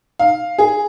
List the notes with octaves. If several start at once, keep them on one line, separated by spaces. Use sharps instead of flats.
F5
G#4